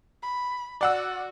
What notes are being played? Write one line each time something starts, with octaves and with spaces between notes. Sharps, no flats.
B5
F#4 D5 F#5 E6